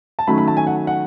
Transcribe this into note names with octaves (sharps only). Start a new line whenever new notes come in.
A5
D#3 F#3 A3 C#4 B5
B5
A5
G#5
F#5
F#5